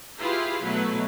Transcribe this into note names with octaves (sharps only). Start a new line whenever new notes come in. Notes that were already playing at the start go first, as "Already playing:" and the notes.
E4 F4 G4 G#4 B4 F5
B2 F#3 A3 E4 B4